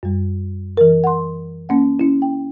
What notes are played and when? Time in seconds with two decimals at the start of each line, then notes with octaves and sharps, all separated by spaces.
0.03 F#2 G3
0.77 E3 A#4
1.04 F#5 C6
1.69 A#3 C#4 F#5
1.99 C#4 E4
2.22 G5